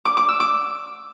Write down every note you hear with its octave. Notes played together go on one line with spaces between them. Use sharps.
D6
D6
E6
D6